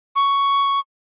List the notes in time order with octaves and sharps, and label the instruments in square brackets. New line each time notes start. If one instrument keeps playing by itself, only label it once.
[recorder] C#6